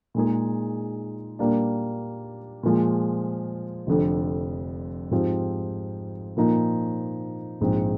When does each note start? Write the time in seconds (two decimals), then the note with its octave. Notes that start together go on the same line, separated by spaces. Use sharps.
0.14 A#2 G#3 D#4 G#4
1.39 A#2 G3 A#3 D4
2.63 A#2 F3 G#3
3.87 F1 F2 D3
5.11 G#2 F3 C4 G4
6.37 A#2 F3 A#3 D#4
7.60 A#1 G#2 F3 C4